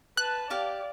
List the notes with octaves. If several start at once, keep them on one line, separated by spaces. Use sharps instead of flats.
B4 A5 F#6
G4 D5 F5 A5